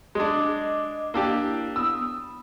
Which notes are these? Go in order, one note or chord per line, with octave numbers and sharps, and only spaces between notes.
G#3 D4 D#5 D6
A#3 D4 E4 G4
B3 D#6 E6